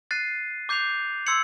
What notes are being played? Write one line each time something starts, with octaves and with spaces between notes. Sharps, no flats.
F#6 A6 C7 D#7
D6 G6 C7 F7
C6 E6 G#6 C#7 F#7